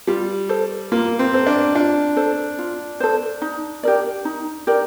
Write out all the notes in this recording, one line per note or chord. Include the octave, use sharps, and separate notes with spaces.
G3 F4
A4 C5
A#3 F4
C4
A4 C5
D4
D4 F4
A4 C5
F4
A4 C5
D#4
G4 A#4 D5
D#4
G4 A#4 D5